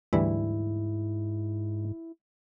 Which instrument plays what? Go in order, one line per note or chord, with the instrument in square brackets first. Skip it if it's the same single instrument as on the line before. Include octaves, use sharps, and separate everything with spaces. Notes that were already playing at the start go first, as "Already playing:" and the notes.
[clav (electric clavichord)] D2 E3 G3 [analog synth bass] G#2 [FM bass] E4